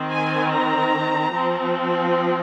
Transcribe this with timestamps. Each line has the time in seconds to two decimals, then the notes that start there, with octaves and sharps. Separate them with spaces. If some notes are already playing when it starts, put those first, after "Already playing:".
Already playing: D#3 C4
0.10 G#5
0.51 A#5
1.32 F3 C4